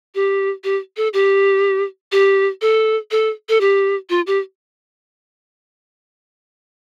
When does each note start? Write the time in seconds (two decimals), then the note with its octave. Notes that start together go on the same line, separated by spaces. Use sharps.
0.15 G4
0.64 G4
0.97 A4
1.13 G4
2.12 G4
2.61 A4
3.11 A4
3.49 A4
3.60 G4
4.10 F4
4.27 G4